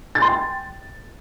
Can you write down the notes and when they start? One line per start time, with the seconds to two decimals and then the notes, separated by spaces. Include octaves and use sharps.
0.15 A6
0.22 C6
0.29 G5